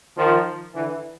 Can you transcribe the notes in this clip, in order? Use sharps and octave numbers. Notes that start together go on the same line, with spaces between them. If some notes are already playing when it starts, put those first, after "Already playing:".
D#3 F3
D3 E3